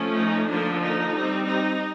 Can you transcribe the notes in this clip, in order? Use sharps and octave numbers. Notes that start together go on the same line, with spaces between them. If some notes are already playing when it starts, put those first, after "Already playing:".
Already playing: F3 A3 C#4
D#4
D3 F3 A#3 D4
D#4
G3 C4
D#4